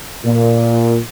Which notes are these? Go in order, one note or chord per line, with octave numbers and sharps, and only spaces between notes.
A#2